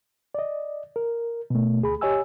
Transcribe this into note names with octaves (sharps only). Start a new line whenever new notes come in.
D5 D#5
A#4
B2 A3
D2 G#4 B5
G4 C#5 D#5 G#5 E6